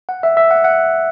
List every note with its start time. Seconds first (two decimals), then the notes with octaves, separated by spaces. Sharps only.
0.09 F#5
0.23 E5
0.37 E5
0.51 F#5
0.64 F#5